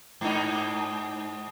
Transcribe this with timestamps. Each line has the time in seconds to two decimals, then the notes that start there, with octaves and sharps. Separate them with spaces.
0.21 G#2 D#4